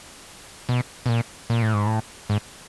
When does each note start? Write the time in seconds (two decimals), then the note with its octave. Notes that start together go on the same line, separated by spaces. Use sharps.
0.69 B2
1.06 B2
1.09 A#2
1.50 A#2
1.62 A2
1.74 G#2
1.86 A2
2.30 G#2